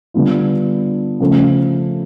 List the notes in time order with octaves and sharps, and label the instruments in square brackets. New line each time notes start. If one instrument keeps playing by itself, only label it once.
[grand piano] D3 G3 B3 D4 F4
C#3 F3 A3